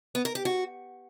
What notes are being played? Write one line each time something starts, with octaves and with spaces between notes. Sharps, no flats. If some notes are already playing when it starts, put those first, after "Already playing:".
B3
A#4
G4
F#4